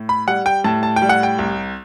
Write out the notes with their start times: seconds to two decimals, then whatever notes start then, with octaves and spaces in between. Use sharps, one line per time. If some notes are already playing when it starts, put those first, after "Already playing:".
Already playing: A2
0.09 B5
0.27 G3 F#5
0.46 G5
0.64 A2 A5
0.83 A5
0.96 G5
1.02 G3
1.09 F#5
1.23 G5
1.39 C2